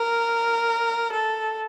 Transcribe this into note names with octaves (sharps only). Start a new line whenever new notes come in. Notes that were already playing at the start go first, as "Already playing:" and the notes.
Already playing: A#4
A4